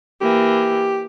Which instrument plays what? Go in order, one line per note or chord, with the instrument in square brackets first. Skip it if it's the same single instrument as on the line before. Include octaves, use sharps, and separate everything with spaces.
[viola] E3 A#3 [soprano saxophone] G4